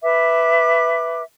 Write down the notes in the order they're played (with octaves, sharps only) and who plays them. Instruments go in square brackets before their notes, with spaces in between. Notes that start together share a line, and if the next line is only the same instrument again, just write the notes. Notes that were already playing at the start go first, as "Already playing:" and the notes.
[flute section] B4 E5 D6